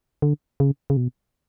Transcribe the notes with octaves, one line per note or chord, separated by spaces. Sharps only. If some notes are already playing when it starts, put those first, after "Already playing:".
D3
C#3
C#3
B2